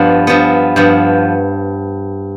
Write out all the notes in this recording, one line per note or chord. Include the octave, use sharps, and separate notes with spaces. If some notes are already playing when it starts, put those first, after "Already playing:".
Already playing: G2 F3 B3
G2 F3 B3
G2 F3 B3